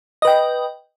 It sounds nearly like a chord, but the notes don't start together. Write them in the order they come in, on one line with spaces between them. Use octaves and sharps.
D#5 B4 G5